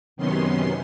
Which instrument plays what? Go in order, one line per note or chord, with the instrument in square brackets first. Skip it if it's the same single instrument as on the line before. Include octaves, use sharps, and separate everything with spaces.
[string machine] F#2 C3 D#3 B3 C#4 C6